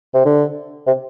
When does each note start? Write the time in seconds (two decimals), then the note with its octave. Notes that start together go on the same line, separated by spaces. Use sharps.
0.14 C3
0.25 D3
0.87 C3